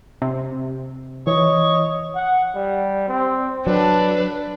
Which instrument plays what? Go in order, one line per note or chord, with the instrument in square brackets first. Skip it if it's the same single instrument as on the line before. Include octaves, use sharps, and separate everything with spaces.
[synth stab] C3
[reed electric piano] E3 [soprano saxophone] C#5 [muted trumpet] D#5
[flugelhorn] F#5
G3
C4
[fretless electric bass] F#3 [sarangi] D4 [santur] A4 A5 [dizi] B4